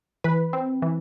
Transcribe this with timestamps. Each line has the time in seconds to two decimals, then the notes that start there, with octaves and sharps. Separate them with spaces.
0.24 E3 B4 B5
0.53 C4
0.82 E3